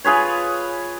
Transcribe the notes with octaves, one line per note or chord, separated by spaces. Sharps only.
F4 G#4 B4 C#5